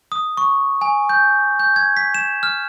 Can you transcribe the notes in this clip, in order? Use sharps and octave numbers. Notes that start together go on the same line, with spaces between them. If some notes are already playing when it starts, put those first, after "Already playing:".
D#6
C#6
G#5
G6
G6
G#6
B6
E7
F6